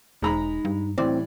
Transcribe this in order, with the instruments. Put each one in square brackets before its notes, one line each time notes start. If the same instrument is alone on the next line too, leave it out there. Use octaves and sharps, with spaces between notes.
[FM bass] E1 [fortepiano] G#3 A#5 B5 [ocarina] D#4
[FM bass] G2
[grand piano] A2 E3 G3 [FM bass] C4 [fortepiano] D5 D6